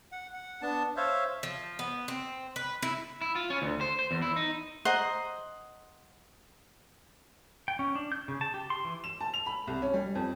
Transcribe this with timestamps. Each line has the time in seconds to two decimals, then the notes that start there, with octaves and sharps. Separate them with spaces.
0.12 F#5
0.33 F#5
0.62 B3 D4 A5
0.97 C5 C#5 E5 F5
1.43 F3
1.79 B3
2.08 C4
2.56 B4
2.82 E4
3.21 E4
3.35 F4
3.50 C#4
3.62 D2
3.81 C5
3.99 C5
4.11 E2
4.22 E4
4.36 D#4
4.85 C5 D#5 F#5 A#5
7.68 G5
7.79 C#4
7.95 D4
8.12 G6
8.28 C#3
8.41 A5
8.54 G4
8.70 C6
8.85 E3
9.04 E7
9.21 A5
9.34 F7
9.46 B5
9.67 C2
9.82 C#4
9.94 G3
10.15 F2